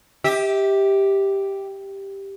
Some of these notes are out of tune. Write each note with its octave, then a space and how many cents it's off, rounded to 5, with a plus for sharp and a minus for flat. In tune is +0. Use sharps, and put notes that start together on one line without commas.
G4 +0 E5 -35